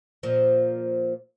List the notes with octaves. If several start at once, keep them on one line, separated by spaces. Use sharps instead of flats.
A#2 F3